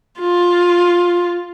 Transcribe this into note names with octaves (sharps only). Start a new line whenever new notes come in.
F4